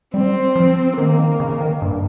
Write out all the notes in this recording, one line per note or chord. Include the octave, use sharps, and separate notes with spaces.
G3 C4
F3
D#3 A#3
D#3
C#3
D#3
G2